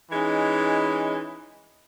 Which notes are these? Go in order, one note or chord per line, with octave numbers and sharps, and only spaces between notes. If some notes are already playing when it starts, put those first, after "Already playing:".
E3 G#3 C#4 D#4